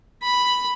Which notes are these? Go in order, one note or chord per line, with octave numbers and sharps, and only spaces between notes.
B5